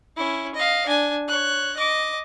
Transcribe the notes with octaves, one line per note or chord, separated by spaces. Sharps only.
C#4 E4
D#5 F5
D4 G#5
C#5 F#6
D#5 D6